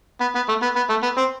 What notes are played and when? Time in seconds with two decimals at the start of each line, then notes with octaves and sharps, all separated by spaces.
0.21 B3
0.35 B3
0.48 A3
0.62 B3
0.76 B3
0.89 A3
1.03 B3
1.17 C4